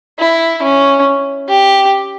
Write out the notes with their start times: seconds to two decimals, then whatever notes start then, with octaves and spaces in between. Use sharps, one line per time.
0.19 E4
0.62 C#4
1.48 G4